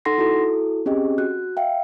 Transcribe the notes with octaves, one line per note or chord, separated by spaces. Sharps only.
D#4 A4 F#5 C6 A#6 C7
E4 F#4 A4
C4 C#4 G4 G#4 D#5
F#4 F#6
E5 F5 G5